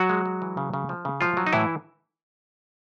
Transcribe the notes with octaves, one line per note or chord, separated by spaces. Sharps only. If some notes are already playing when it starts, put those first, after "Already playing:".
Already playing: F#3 F#4
G#3
G#3
E3
C#3
C#3
F3
C#3
F3 F#3 F4
F#3
D#4
A2 E3 E4